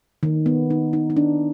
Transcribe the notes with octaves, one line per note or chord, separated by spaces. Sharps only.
D#3
B3
D#4
D#4
D#4
D4